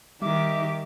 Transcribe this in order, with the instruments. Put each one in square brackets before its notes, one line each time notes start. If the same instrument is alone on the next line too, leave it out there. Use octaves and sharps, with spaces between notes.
[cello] D#3 G4 [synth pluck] G3 [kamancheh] E5 [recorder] D6